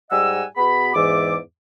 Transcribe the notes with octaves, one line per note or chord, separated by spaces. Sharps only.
G#2 G3 D#5 F#5 G#5 E6
B2 B3 G#4 B5
E2 G#2 E3 D5 E5 D6